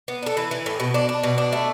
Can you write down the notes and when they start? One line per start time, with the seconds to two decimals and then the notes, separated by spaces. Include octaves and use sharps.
0.08 B3
0.23 D4 A4
0.37 E3 B4
0.51 E3
0.66 A2
0.80 B2
0.94 D4
1.09 D4
1.23 B2
1.38 D4
1.53 A3